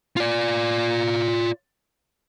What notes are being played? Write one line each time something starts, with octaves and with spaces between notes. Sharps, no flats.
F4 D5